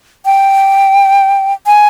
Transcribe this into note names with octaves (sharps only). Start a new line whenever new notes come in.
G5
G#5